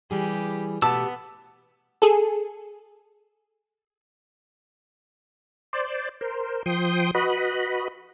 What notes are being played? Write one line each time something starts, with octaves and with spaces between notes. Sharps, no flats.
E3 G3 G4 G#4
B2 A3 B3 G4 A5 D6 E6
G#4 A4
C5 D5
A#4 C5
F3 G5 C6 D#6
F#4 B4 D#5 B5